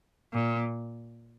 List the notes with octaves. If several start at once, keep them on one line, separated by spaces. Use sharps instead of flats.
A#2